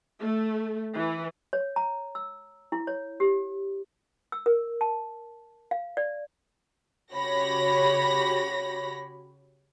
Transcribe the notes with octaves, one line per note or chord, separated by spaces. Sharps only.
A3
E3
C#5
A#5
E6
E4
C#5
G4
E6
A#4
A5
F5
D5
C#3 F#4 G4 C#5 B5 A#6